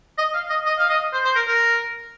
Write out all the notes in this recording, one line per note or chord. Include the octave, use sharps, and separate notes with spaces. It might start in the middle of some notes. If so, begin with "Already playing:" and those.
D#5
F5
D#5
D#5
F5
D#5
C5
C5
A#4
A#4